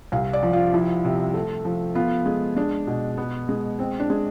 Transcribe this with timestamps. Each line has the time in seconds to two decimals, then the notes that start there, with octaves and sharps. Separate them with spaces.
0.12 C2 F5
0.33 D5
0.43 F3
0.53 F4
0.73 F3 E4
1.05 C3
1.34 A3
1.65 F3
1.95 B3 F4
2.26 G#3
2.56 G#3 D4
2.87 B2
3.17 B3
3.49 G#3
3.79 C4
4.00 D4
4.10 G#3